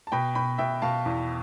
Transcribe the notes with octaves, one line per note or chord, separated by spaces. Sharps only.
A5
B2 G5 B5
B2 G5 B5
B2 E5 G5
B2 F5 A5
E2